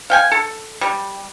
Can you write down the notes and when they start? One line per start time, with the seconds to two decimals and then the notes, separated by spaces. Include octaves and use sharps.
0.10 F5 G5 G#5
0.32 A4
0.81 G3